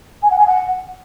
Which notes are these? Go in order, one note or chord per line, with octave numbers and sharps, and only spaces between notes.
G#5
F#5
G#5
F#5